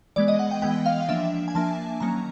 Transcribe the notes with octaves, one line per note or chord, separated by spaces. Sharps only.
E3 G#3 B3 D5
D#5
F#5
G5
E3 G#3 B3 G5
F5
F3 A#3 D4 E5
G#5
F3 A#3 D4 A5
D#3 F#3 A#3 C#4 A#5